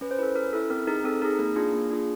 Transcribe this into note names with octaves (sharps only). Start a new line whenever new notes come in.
C#4 B4
C5
E4 A4 B4
C#4 A#4
E4 A4
C4 A#4
D#4 G#4 A#4
C4 A4
D#4 G#4 A#4
A#3 A#4
D4 F4 G#4
A#3
D4 F4 G#4